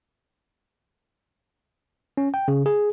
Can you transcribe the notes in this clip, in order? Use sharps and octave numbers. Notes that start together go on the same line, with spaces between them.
C#4
G5
C#3
G#4